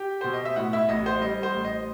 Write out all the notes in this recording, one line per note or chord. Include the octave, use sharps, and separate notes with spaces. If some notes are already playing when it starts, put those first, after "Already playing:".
Already playing: G4 G5
B2 C5
D#5
E5
A2 F#4 F#5
E4 E5
A1 D#5
C5
G3 D#5
C5
A1
D#5